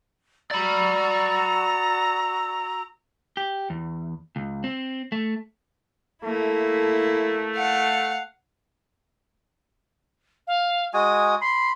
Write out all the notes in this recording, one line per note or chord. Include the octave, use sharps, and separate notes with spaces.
F#4 D5 A#5 B5 E6
G4
E2
C#2
C4
A3
A3 A#3 E4 A4
F5 F#5
F5
G#3 F#4 G#5 D#6
B5 C6 C7